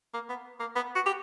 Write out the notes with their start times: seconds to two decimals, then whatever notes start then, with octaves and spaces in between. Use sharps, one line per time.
0.14 A#3
0.29 B3
0.60 A#3
0.75 B3
0.95 F#4
1.06 G4